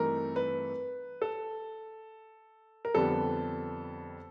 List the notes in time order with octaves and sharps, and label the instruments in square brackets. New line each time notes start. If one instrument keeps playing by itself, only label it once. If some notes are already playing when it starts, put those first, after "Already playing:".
Already playing: [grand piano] G2 E3 A3 C4 D#4 A#4
B4
A4
A#4
F2 D3 G3 B3 A4